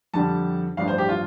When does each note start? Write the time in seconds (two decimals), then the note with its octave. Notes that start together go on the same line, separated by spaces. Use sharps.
0.13 F2 D3 G3 A5
0.77 A1 G2 F3 D4 F5
0.88 C5
0.98 G4
1.09 F4